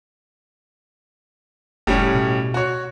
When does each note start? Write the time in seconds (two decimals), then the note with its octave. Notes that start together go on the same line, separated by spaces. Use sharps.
1.87 F#1 A2 G3 C#4
2.15 B2
2.54 F#4 C#5